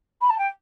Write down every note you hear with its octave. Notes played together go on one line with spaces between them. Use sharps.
B5
A5
G5